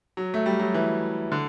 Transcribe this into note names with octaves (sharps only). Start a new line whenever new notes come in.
F#3
A3
G3
F#3
E3
D3